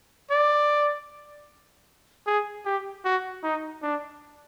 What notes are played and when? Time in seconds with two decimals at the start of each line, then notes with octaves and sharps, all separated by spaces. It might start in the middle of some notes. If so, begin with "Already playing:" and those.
0.31 D5
2.26 G#4
2.65 G4
3.05 F#4
3.43 D#4
3.83 D4